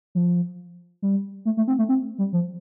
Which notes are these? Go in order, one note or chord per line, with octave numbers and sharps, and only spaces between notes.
F3
G3
A3
A3
C4
A3
C4
G3
F3